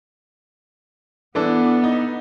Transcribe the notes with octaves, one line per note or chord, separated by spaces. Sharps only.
E3 B3 D4 A4
D#4